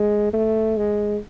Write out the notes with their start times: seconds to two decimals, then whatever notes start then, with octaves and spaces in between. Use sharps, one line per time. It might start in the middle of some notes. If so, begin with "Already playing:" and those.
Already playing: G#3
0.33 A3
0.77 G#3